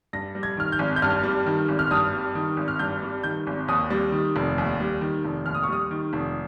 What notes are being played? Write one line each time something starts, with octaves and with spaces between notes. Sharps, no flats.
G2 A#6
G3
G#6
D#3 F6
G6
G#1
G6
G2 F6
G3
D#3
G#1
F6
G2 D#6
G3
D#3
G#1
F6
G2 G6
G3
D#3 G6
G#1
D#2 D#6
G3
D#3
F1
D#2
G3
D#3
F1
D#2 F6
D#6
C#6
G3 D#6
D#3
F1